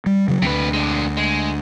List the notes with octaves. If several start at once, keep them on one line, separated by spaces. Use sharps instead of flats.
G3
C#3 F#3
D2 C3 B4
G#3 D4
G#3